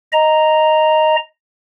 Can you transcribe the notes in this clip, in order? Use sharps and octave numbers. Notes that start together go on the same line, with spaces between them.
D#5 A#5